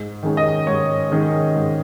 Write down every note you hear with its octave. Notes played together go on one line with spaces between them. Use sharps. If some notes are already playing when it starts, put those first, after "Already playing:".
Already playing: G#2
D#3 G#3 C#4
D#5
G#2 C#5
D#3 G#3 C#4
G#2